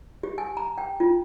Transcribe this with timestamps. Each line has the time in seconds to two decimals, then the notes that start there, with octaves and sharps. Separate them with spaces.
0.23 G4
0.38 G#5
0.57 A#5
0.78 G5
1.00 F4